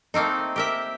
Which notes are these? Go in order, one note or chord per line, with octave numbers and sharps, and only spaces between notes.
A3 A#3 C4 D#4
G4 A#4 E5